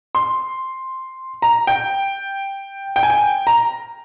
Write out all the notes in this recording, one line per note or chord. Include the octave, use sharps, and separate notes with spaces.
C6
A#5
G5
G5
G#5
G5
A#5